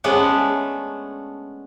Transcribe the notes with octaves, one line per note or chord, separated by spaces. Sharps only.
G#3 A3 B3 C#4 D4